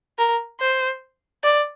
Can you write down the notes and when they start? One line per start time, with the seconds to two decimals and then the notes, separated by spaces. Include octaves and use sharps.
0.18 A#4
0.60 C5
1.43 D5